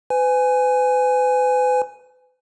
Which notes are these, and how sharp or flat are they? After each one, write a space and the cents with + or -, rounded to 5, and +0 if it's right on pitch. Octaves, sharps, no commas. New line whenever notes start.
B4 +40 G#5 +0